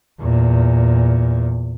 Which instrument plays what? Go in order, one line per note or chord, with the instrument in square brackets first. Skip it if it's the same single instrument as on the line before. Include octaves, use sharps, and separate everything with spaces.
[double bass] E2 A#2